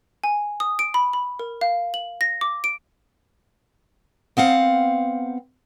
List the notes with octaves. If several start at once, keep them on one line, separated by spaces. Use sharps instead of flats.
G#5
D#6
D7
B5
B5
A#4
F5
F#7
A#6
D6
D7
B3 C4 F5 F#5